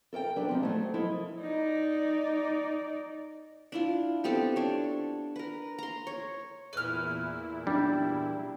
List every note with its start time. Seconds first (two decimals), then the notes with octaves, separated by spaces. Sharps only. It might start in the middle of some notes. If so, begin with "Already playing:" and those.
0.13 A4 A#4 D5 G5
0.36 F#3 D4 B4 D5
0.49 G#2 F3 C4
0.63 F#3 A3
0.94 F3 E4 A4 A#4 D#5
1.41 D#4 D5
3.72 D4 E4 F4
4.24 B3 C4 G4 A4
4.56 D4 C#5
5.36 A#4 B4
5.78 A#5 C6
6.07 C#5
6.73 E2 A#2 E4 B4 F6
7.67 G3 D4